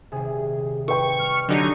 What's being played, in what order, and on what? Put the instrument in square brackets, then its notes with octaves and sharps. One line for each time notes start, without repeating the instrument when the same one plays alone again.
[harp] D#1 C3 [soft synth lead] G#4
[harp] G#2 E6 [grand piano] B4 G5 [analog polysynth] C#6
[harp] G3 [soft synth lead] F6
[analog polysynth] D3 D#4 C#6 [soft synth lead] F#3 [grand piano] D4 G4 [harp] G#5 F#6